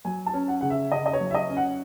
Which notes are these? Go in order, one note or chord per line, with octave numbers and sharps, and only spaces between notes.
F#3 G#5
A5
C#4
F#5
C#3 F#5
E5
C#3 D#5
D#5
C#5
F#3
E5
D#5
C#4
F#5